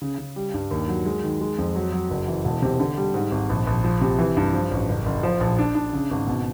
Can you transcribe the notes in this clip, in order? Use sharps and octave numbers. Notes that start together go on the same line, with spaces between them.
C#3
C#3
G3
G2
D#2
F#3
G#3
D#3
G#3
F2
F#3
F#3
F#1
E3
E1
C3
D3
G3
G#2
G#1
A#1
A#1
F3
C3
E3
G2
F3
A1
F#1
F#1
F3
A#1
D4
D4
C#3
G#1
B2